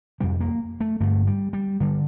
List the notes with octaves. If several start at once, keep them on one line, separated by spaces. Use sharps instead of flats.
F2 C3 G3
A#3
A3
G2 D3 A3
G3
G3
D3 G3